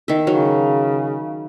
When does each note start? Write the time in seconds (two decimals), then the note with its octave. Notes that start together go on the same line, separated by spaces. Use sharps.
0.08 D#3 E5
0.27 C#3 F#3